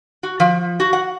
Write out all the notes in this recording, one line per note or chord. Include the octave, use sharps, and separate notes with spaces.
F#4
F3
F#4
F#5